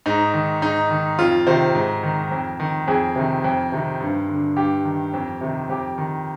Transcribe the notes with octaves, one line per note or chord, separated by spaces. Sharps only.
G#2 D#4
D#3
G#2 D#4
D#3
F2 F4
C3 D#3 C5
G#2
D#3
F2
D#3
F2 G#4
C3 D#3
F2
C3 D#3
G2
D3
G2 G4
D#3
F2
C3 D#3
F2 G4
D#3